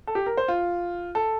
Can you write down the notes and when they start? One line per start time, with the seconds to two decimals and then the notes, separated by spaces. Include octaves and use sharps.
0.07 A4
0.15 G4
0.26 A#4
0.37 C5
0.48 F4
1.15 A4